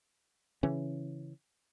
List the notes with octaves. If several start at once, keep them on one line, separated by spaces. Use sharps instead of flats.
C#3 E3 C#4